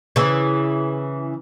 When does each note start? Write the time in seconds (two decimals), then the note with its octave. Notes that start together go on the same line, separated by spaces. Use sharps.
0.16 C#3 E3